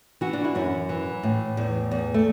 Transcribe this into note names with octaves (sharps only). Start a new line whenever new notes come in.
E3 F#4
D4
E4
F#2 F#4
E3
A2
E2
E2
A3